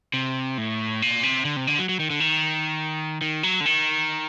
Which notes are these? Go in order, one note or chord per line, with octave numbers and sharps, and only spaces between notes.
C3
A2
A#2
C3
D3
C3
D3
F#3
F#3
D#3
D3
D#3
D#3
F#3
D3
D#3